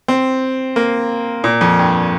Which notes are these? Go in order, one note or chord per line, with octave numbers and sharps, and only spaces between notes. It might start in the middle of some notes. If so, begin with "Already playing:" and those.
C4
A#3
A#2
F2
G2